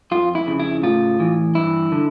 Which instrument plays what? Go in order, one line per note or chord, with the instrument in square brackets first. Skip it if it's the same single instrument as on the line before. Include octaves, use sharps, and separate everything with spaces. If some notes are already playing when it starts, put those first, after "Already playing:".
[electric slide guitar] F2 F4
E4
C#3
E4
A2 F4
E3
G2 E4
D3